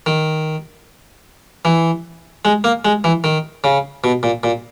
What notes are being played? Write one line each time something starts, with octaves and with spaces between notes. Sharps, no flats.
D#3
E3
G#3
A#3
G#3
E3
D#3
C#3
B2
A#2
A#2